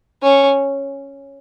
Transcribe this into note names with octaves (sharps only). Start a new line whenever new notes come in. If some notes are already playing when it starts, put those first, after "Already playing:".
C#4